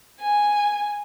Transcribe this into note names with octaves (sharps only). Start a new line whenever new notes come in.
G#5